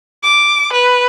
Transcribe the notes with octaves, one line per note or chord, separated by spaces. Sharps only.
D6
B4